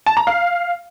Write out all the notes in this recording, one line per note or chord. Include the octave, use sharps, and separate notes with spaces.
A5
A#5
F5